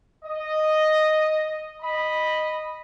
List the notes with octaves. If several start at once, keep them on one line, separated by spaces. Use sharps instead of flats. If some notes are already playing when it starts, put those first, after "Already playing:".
D#5
D#5 B5